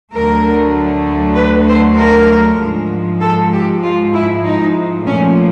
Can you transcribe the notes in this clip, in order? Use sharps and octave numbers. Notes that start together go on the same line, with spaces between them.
D2 D3 F#3 A3 A#4
B4
C5
A#4
G#2 F3 G#3
A4
G4
F4
E4
D#4
A#2 F3 A3 C#4